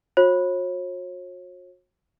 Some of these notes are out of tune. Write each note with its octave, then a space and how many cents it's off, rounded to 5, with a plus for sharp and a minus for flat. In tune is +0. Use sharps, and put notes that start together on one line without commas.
F#4 -40 C#5 -40